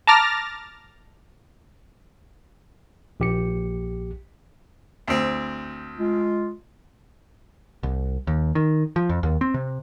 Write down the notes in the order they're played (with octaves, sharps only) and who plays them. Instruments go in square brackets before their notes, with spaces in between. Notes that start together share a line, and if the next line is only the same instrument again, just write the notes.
[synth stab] A5 A#5 D6 F6 A6 A#6
[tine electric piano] A#1 G4 C#7
[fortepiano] D2 C4
[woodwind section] G#3 F4
[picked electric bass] C2
D#2
D#3
F3
F2
D#2
C4
C3